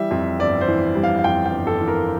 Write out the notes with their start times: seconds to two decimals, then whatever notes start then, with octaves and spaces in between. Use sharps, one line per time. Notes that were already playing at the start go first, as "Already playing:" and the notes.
Already playing: E3 G3 E5
0.11 F2
0.39 G1 D5
0.61 C5
0.68 E3
0.95 G3
1.04 F5
1.19 F5
1.24 F2 G5
1.46 G5
1.53 G1
1.67 A4
1.80 E3
1.88 A#4